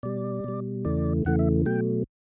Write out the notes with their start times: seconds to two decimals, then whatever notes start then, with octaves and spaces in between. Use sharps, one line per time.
0.03 B2 G3 D5
0.44 B2 G3
0.85 E2 C#3 E3 A3 D5
1.25 E2 C#3 E3 A3 F#5
1.39 E5
1.66 B2 F#3 A3 G5